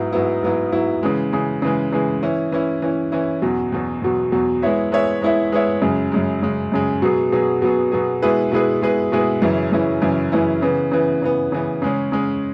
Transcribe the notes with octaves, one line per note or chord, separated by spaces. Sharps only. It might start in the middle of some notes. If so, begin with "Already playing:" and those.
Already playing: G#2 F#3 B3 E4
G#2 F#3 B3 E4
G#2 F#3 B3 E4
G#2 F#3 B3 E4
C#3 E3 G#3
C#3 E3 G#3
C#3 E3 G#3
C#3 E3 G#3
E3 C#4 E4
E3 C#4 E4
E3 C#4 E4
E3 C#4 E4
E2 B2 F#3
E2 B2 F#3
E2 B2 F#3
E2 B2 F#3
G#3 B3 E4 C#5 E5
G#3 B3 E4 C#5 E5
G#3 B3 E4 C#5 E5
G#3 B3 E4 C#5 E5
F#2 C#3 G#3
F#2 C#3 G#3
F#2 C#3 G#3
F#2 C#3 G#3
B2 F#3 B3 G#4
B2 F#3 B3 G#4
B2 F#3 B3 G#4
B2 F#3 B3 G#4
B2 G#3 E4 G#4 B4
B2 G#3 E4 G#4 B4
B2 G#3 E4 G#4 B4
B2 G#3 E4 G#4 B4
F#2 C#3 E3 C#4 E4
F#2 C#3 E3 C#4 E4
F#2 C#3 E3 C#4 E4
F#2 C#3 E3 C#4 E4
C#3 E3 B3
C#3 E3 B3
C#3 E3 B3
C#3 E3 B3
C#3 G#3 C#4
C#3 G#3 C#4